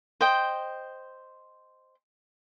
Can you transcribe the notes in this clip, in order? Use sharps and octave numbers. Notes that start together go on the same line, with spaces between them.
C5 D#5 G5